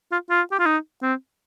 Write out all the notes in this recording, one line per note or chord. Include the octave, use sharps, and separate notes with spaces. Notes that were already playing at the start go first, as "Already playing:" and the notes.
F4
F4
G4
F4
D#4
C4